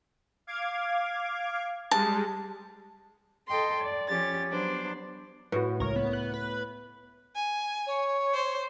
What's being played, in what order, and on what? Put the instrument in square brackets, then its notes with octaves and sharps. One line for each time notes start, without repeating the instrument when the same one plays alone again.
[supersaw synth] F5 D6 G#6
[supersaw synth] G3 G#3 [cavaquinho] A5
[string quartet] A4 D#5 G5 C6
D5
F3 C#4 G4 A6
F#3 B3 D4 C5 D5
[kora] A2 [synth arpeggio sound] F#4 B4
[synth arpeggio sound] C#2 C#5 [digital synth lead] A#4
[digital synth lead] B3
[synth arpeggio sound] F#6
[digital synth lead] B4
[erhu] G#5
[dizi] C#5
[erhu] C5